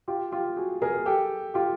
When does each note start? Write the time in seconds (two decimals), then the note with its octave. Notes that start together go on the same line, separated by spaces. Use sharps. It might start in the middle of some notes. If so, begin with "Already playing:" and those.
0.08 F4 G4
0.32 F4 G4
0.56 F#4 G#4
0.82 G#4 A#4
1.05 G4 A4
1.54 F4 G4